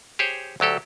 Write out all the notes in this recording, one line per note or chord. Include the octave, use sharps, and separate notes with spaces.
G4 G#4 C5 C#5
D2 F#3 G4 A4